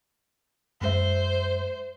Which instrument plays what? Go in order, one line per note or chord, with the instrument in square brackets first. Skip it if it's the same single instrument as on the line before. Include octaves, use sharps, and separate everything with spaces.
[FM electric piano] F#2 G#3 E5 [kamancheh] C5